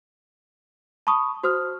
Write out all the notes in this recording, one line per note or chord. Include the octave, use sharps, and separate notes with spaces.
A5 B5 C#6 D#6
F#4 C5 D#6 F6